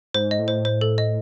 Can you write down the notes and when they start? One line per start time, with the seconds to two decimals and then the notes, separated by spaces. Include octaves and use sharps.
0.15 G#2 C5
0.31 D#5
0.39 A2
0.48 C5
0.65 C5
0.81 A4
0.98 D#5